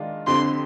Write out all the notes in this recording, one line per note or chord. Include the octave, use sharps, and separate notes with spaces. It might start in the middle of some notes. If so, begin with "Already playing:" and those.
Already playing: D#3 G#3 D4 F4
F2 D3 G3 C4 C6